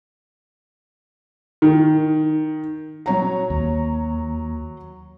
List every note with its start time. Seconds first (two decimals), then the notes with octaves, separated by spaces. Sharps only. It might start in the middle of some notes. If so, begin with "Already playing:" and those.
1.62 D#3
3.06 F#3 C#5 A#5
3.50 D#2